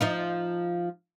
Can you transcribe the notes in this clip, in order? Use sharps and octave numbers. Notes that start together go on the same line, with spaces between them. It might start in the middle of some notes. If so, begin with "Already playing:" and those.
F3 D#4 F4